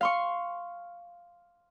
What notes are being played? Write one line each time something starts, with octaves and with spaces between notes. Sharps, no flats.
F5 C6 C#6